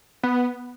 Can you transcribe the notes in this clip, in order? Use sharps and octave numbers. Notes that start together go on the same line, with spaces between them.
B3